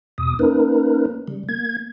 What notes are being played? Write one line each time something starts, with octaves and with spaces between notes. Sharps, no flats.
E2 B2 D#6
A#3 C#4 D#4 A#4 B4
C#3 G3
A#3 G#6